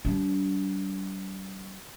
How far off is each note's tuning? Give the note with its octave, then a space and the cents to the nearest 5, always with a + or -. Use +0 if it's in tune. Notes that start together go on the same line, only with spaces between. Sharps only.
G3 -40 D4 -40